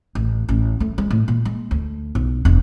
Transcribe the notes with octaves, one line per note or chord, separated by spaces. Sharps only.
A1
A1
A3
G#3
A2
A#2
G#3
D2
B1
E1